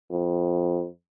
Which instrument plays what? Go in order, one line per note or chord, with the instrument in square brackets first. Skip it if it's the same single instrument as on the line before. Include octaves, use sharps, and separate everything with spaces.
[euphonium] F2